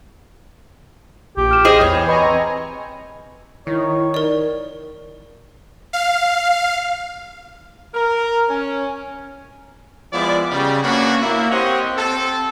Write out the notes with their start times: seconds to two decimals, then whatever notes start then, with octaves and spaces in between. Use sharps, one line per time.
1.37 A#1 G4
1.51 F6 E7
1.65 G#4 C5 D#5 G5
1.81 E2 E3 C#5
2.08 B4 D#5 G#5 A#5 B5 C#6
2.21 C4
3.67 D#3 E4 C#5
4.14 D#4 A#4 D5
5.93 F5
7.94 A#4
8.49 C#4
10.13 F3 G#3 B3 E4 D5
10.51 C#3 G3
10.83 A#3 B3 C#4 D4 F#4
11.22 A#3 E4
11.51 C4 G4 C5 C#5 D#5 F#5
11.97 C4 A4